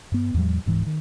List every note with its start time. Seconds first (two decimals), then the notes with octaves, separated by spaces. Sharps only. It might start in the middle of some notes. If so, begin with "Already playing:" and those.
0.12 G2 B3
0.34 E2 A2 F3 G3
0.66 D1 G#2 E3
0.87 D#3